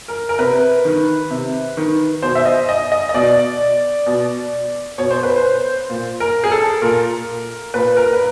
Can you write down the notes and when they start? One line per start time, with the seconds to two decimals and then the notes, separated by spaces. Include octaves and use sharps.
0.08 A#4
0.29 A#4
0.38 C3 B4
0.85 D#3
1.30 C3
1.77 D#3
2.22 B2 C5
2.35 E5
2.46 D#5
2.69 D#5
2.92 D#5
3.09 D#5
3.14 B2 D5
4.06 B2
4.98 B2 C#5
5.10 C5
5.23 B4
5.36 C5
5.90 A#2
6.20 A#4
6.44 G#4
6.52 A4
6.82 A#2 A#4
7.74 A#2 B4
7.97 A#4
8.13 B4